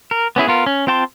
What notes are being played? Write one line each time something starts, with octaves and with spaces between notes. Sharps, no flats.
A#4
B3 C#4 E4 G#4
B3 F4 A#4
C#4
C4 F4 G5 A5 C6